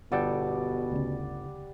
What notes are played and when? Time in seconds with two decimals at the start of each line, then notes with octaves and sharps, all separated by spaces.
0.12 G1 B2 G3 A4 D5 F#5 G5
0.92 D2 C#3